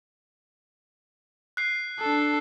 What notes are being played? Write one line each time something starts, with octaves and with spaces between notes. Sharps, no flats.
F#6 C7
D4 A4